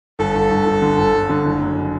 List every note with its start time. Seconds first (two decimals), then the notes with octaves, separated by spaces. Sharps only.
0.19 G1 A4
0.35 G1
0.51 G1
0.66 G1
0.82 D3
0.98 G1
1.14 G1
1.29 D3
1.45 F#1
1.61 F#3